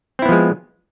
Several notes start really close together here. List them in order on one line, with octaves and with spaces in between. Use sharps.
C4 E4 B3 F3 G#3